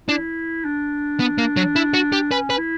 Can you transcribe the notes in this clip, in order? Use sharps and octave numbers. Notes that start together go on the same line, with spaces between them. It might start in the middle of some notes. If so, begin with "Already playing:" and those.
D4 E4
D4
B3
A#3
F#3
E4
F#4
G4
C#4 B4
B4
E4